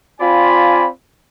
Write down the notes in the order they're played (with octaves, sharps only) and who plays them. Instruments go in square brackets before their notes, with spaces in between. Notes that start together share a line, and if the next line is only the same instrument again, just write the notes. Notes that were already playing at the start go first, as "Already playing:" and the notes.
[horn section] C4 F4 D5 F5 G#5 B5